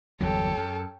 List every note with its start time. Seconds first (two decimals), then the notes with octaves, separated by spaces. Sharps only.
0.21 G1 E2 F#3 G4 A4 C#5
0.57 F#2